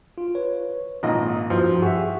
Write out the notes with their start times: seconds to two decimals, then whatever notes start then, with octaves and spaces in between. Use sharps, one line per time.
0.18 F4
0.35 B4 C#5
1.03 G#1 A#2 F4 D#5
1.50 G2 F3 F#4
1.82 G4 G#4 E5 F#5 C#6